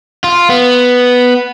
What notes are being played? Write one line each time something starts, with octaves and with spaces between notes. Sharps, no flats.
F4
B3